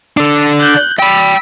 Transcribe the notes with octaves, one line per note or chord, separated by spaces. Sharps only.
D4 A4
F#6 G6
G5 B5 E6 B6